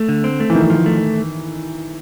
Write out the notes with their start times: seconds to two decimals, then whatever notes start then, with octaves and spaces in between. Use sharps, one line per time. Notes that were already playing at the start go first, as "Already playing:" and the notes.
Already playing: A3
0.09 D3
0.24 C4
0.40 A3
0.50 E3
0.55 D#3 F3
0.70 F3
0.86 A3